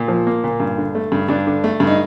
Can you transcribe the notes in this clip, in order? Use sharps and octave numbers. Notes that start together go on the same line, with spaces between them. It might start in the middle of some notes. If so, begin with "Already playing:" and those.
Already playing: A#2
F3
A#3
A#2
G2
D3
A3
G2
G2 D4
D3
A3
G2
D#4